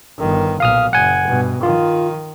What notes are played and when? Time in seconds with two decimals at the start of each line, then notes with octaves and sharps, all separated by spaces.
0.19 G1 D#3
0.60 B1 A#2 F5 D#6 F6
0.93 F#1 F#5 G#5
1.28 G2 B2
1.63 D#3 F4